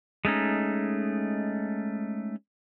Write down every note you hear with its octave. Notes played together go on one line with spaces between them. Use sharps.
G#3 A3 C#4 D#4